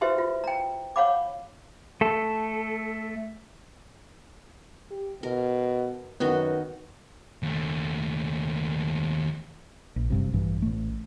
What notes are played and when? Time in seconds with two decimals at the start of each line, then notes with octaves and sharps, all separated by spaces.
0.01 E4 F#4 G4 B4 C5 E5
0.18 F4
0.44 G5 A#5
0.96 C#5 F5 F#5 B5 D6
2.01 A3 A4
4.91 G4
5.23 B2 A#4
6.20 F#2 D#3 B3 F#4 D#5
7.43 D#2 A3
9.96 A#1
10.10 F#1 G2 C3
10.33 A1 G2 E3
10.62 A1 A3